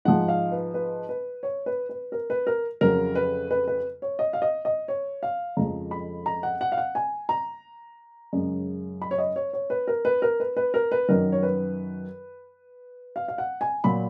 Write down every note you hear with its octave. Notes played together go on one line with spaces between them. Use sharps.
G#2 F3 G#3 F#5
F5
B4
B4
B4
C#5
B4
B4
A#4
B4
A#4
F2 C#3 F#3 A#4
B4
B4
B4
C#5
D#5
F5
D#5
D#5
C#5
F5
F2 C#3 F3 G#3 A#5
B5
A#5
F#5
F#5
F5
F#5
G#5
A#5
F#2 C#3 G#3
B5
C#5
D#5
C#5
C#5
B4
A#4
B4
A#4
B4
B4
A#4
B4
F#2 D#3 F#3 A#4
C#5
B4
F5
F5
F#5
G#5
A#2 F#3 B5